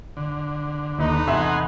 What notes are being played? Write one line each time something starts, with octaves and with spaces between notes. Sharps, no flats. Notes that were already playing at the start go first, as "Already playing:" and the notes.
D3
D#2 A3 D#4 B4
E2 C3 E5 F#5 G#5 C6